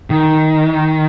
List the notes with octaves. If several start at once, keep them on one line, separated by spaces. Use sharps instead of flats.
D#3